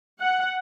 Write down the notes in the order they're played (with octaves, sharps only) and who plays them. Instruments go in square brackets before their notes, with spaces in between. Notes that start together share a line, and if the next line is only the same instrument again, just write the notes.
[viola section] F#5